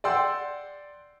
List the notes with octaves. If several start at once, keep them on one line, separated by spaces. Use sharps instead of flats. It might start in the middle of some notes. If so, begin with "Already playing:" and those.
D5 F#5 G5 C6 E6 G6